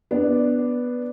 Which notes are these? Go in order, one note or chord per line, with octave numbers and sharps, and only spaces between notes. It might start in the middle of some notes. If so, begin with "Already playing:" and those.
B3 D4 D5